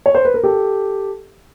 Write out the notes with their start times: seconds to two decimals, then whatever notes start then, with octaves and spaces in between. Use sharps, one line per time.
0.06 C#5
0.15 C5
0.25 B4
0.34 A#4
0.44 G4 A4